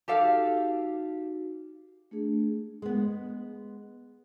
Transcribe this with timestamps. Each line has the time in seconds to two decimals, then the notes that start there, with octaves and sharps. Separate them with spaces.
0.08 D#4 F#4 G4 A4 F5
2.11 A3 D4 G#4
2.82 G#3 B3